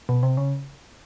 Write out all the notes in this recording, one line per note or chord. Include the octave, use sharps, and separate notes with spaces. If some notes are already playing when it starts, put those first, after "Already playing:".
B2
C3
C#3